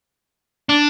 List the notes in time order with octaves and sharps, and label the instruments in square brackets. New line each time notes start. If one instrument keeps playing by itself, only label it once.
[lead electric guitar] D4